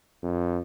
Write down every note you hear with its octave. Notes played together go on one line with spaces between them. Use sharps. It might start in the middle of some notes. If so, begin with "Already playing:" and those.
F2